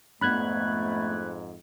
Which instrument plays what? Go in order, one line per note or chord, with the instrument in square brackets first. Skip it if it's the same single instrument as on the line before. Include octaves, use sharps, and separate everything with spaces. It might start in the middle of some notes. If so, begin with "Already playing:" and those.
[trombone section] F2 G#2 [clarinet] A3 [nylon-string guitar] B3 D4 [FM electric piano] B5 F#6 G#6